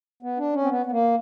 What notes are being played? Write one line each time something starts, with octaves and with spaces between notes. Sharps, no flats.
B3
D4
C#4
C4
B3
B3
A#3